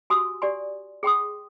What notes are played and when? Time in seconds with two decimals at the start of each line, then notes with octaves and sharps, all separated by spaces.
0.10 F#4 G4 G#5 C6 D#6 E6
0.42 G4 D5 G#5 C6
1.03 G#4 G5 C6 D#6